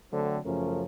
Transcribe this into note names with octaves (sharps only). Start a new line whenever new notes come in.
D3 F#3 A3 C4
F#2 C#3 F3 A3 C#4 A#4